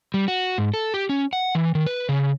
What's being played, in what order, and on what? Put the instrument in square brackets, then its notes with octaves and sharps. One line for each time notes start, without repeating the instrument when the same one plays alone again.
[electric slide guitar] G3
F#4
G#2
A4
G4
C#4
F#5
E3
D#3
B4
C#3